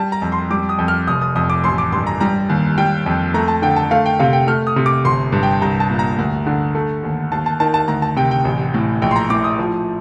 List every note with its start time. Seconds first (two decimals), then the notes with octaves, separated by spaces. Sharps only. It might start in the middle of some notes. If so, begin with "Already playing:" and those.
Already playing: G3 A5
0.12 A#5
0.22 F2
0.32 C6
0.50 G3 D6
0.69 D#6
0.78 F2
0.88 F6
1.07 F1 D#6
1.21 D#6
1.35 F2 D#6
1.50 D6
1.64 A1 C6
1.78 D6
1.92 G2 C6
2.07 A#5
2.20 G3 A#5
2.49 D#2
2.78 G3 G5
3.06 F2
3.34 A3 A#5
3.48 A5
3.62 D3 G5
3.76 A5
3.91 A3 F5
4.06 G5
4.19 C3 F5
4.33 G5
4.47 A3 F6
4.67 D#6
4.76 C3
4.86 D6
5.05 G1 C6
5.32 G2
5.43 G5
5.61 C2 A#5
5.80 A5
5.90 A#2
5.99 A#5
6.18 D2
6.46 D3
6.75 A3
7.03 D#2
7.32 D#2 A5
7.46 A5
7.60 D#3 A5
7.74 A5
7.88 D2 A#5
8.02 A5
8.16 C3 G5
8.31 G5
8.45 A1
8.74 A2
9.02 A#1 G5
9.11 C6
9.16 A#5
9.30 A2 D6
9.44 D#6
9.59 F3